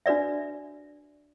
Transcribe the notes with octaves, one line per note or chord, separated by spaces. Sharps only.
D4 F#4 B4 D5 E5